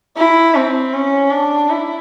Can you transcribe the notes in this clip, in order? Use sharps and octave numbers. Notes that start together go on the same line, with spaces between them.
E4
C4
C#4
D4
E4